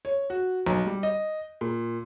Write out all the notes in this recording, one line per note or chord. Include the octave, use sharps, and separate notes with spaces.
C#5
F#4
B1
G3
D#5
A#2